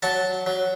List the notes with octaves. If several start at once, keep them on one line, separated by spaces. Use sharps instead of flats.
F#3 F#5 A5
F#3